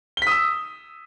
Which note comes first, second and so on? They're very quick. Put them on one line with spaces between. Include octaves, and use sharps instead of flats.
G7 B6 D#6 E6